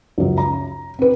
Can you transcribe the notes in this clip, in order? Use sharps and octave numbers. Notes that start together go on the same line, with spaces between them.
C#2 F#2
A#5
C4 B4